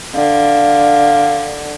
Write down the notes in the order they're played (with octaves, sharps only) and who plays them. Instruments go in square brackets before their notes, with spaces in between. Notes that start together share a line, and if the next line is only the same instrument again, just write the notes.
[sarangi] D3 [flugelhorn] F5